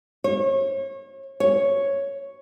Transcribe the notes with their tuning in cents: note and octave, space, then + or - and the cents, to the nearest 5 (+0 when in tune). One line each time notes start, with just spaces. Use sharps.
C#5 -35
C#5 +0